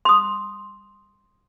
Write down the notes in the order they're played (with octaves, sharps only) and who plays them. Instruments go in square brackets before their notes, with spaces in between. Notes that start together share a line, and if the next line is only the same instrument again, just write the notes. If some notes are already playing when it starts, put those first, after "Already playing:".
[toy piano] C6 D#6